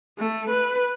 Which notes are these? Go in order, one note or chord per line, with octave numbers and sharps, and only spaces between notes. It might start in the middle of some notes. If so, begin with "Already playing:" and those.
A3
B4